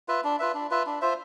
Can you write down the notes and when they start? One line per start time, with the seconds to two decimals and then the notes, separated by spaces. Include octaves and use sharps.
0.08 F4 B4 E5
0.24 D4
0.39 F4 B4 E5
0.55 D4
0.71 F4 B4 E5
0.86 D4
1.01 F4 C5 E5